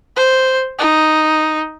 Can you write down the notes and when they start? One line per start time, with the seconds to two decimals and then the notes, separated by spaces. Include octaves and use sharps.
0.16 C5
0.79 D#4